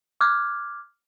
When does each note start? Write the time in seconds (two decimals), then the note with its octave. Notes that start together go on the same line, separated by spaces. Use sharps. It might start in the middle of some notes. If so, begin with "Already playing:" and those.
0.21 D6 F6 F#6 G#6